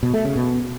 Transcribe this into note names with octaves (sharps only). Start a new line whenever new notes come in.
B2
A3
C#3
B2